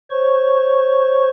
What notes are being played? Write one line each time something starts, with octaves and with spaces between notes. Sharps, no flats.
C5 C#5 C#6